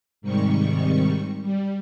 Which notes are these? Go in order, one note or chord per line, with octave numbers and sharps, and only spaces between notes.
G#2 C3 D#3 G3 C#6
G3